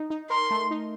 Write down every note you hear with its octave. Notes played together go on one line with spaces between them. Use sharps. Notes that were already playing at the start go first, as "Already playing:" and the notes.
Already playing: D#4
D#4
A#4 C6
A3
D#4